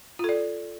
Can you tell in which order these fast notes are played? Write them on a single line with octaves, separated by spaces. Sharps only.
F4 A4 D5